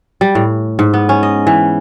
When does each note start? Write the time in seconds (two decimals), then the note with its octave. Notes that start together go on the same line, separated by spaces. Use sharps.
0.21 G3
0.35 A2
0.79 G#2
0.94 B3
1.09 C#4
1.23 D#5
1.47 E3